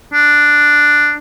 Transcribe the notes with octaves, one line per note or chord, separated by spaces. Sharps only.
D4